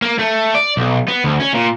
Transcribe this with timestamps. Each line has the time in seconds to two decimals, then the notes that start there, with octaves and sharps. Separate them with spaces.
0.02 A#3
0.19 A3
0.55 D5
0.77 B1
1.08 B3
1.24 D2
1.40 C#4
1.54 A#2